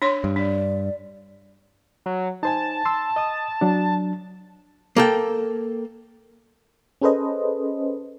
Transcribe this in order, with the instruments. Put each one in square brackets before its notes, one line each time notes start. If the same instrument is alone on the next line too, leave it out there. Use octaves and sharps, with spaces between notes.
[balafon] D4 C#5 C6
[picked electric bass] G2
[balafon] D4 [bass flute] D5
[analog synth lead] F#3
[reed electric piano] D#4 C5 G#5 [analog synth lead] A5
[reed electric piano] C6 E6
D#5 D#6
F#3 D4
[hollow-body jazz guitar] A#3 A4 G5
[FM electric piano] C#4 G#4 A4 B4 C5 D#5